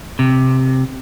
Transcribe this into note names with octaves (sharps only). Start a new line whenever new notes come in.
C3